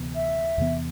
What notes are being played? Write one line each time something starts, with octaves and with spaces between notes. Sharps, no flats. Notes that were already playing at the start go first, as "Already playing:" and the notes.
Already playing: D2 C3 E3 B3
E5
E2 C3 E3 B3